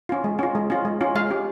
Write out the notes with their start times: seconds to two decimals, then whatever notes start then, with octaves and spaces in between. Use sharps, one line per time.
0.09 C#4 F4
0.24 G#3
0.39 C#4 F4
0.55 G#3
0.70 C#4 F4
0.85 G#3
1.01 C#4 F4
1.15 G#3 F5
1.30 C#4 G4